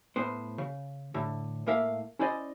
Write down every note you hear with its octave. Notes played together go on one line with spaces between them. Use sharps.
A2 B3 C5
C#3
A2 D3
A2 A#3 A#4 E5 F5
C#4 E4 C5 D5 D#5